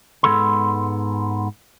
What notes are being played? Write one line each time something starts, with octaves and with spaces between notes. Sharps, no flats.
G#2 G#3 B3 A4 B5 C6